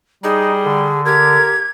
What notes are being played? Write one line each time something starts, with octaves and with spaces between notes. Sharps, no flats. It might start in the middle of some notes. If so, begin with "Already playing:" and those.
G3 D#4 G#4
D3
G4 A#4 G#6